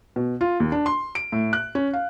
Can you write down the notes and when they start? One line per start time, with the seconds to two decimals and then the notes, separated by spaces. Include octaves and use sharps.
0.16 B2
0.41 F4
0.60 D#2
0.72 D4
0.86 C6
1.15 D7
1.32 A2
1.53 F#6
1.75 C#4
1.93 F5